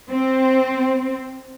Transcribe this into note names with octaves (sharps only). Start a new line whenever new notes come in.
C4